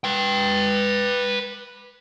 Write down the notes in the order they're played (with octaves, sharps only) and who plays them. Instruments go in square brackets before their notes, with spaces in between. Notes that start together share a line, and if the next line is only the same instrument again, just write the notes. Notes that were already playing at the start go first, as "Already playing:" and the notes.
[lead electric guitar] B4 G5